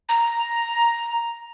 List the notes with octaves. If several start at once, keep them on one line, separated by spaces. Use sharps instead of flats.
A#5